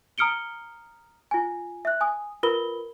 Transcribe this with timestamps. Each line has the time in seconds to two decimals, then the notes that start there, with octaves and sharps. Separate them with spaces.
0.18 A#5 D#6 F6 C#7 D7 G7
1.31 F4 G#5
1.85 E5 F#6
2.01 G#5 D#6
2.43 F4 A#4 B4 B5 G7